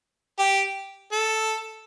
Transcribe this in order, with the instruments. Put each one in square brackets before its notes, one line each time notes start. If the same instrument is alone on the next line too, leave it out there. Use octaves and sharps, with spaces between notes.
[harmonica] G4
A4